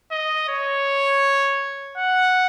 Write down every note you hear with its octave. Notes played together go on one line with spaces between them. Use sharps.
D#5
C#5
F#5